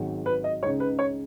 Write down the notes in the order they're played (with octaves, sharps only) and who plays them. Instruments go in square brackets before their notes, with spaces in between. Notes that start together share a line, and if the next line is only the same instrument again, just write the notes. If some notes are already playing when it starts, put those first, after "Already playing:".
Already playing: [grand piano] G#1 G#2 D#3 F#3
[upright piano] B4
D#5
[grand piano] C#2 C#3 G#3 D#4 [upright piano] C#5
[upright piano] B4
C#5